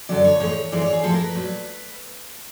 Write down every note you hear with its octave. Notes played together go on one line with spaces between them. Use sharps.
F#2 D3 F#3 D5
C#5
A2 E3 G#3 C#5
G#2 E3 G#3 D5
C#5
G#4
A2 F3 G#3 A4
A#4
B4
A#2 F#3